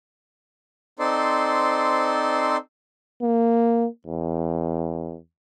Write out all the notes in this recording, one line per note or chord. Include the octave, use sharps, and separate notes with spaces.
C4 D#4 A4 C5 D5 C6
A#3
E2